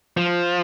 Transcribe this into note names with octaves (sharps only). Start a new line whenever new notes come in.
F3